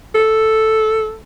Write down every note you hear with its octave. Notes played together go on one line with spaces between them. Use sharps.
A4